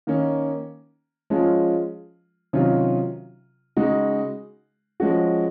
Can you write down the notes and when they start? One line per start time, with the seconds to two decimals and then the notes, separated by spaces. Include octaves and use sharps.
0.07 D#3 A#3 C#4
1.30 F3 G#3 C#4 F4
2.53 C3 D#3 F#3 C#4 F4
3.77 C#3 G#3 D#4 F#4
5.00 F3 G#3 C#4 F#4